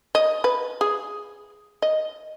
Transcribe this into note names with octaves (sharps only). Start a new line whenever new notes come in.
D#5
B4
G#4
D#5